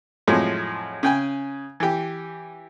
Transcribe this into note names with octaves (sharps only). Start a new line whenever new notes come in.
F2 A2 F3 F#3 G#3
C#3 G5 G#5
E3 G4